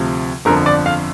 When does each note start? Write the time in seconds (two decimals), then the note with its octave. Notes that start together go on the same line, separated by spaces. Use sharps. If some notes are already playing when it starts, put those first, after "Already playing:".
Already playing: D2 C3 F3
0.45 G1 F2 D3 F3 A#4
0.66 D5
0.86 F5